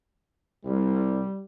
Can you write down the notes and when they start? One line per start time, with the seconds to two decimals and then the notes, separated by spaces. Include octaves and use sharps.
0.65 C2 G3